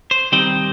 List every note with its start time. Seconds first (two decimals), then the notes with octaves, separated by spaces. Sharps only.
0.11 C5
0.32 D#3 G3 C4 D#4 C5